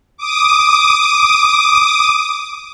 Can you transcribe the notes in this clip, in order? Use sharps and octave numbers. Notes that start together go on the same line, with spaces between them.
D6 D#6